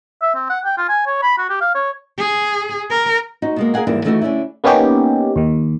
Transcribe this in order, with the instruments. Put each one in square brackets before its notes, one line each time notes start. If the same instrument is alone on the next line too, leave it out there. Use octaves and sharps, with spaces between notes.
[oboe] E5
C4
F#5
G5
F4
G#5
C#5
B5
F#4
G4
F5
C#5
[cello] G#4
A#4
[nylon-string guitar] D#4 F#4 C5
B2 G#3 A#3
G#4 A#4 F5 F#5 G#5
D#2 G#2 E3 G3 E4 A#4
D#3 E3 A3 D#4 E4 F#4
D3 A3 C#4 E4
[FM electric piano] A#3 B3 C#4 D#4 G4
D#2 D#3